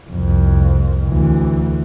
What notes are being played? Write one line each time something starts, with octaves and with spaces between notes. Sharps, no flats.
C2 F2
D2 E3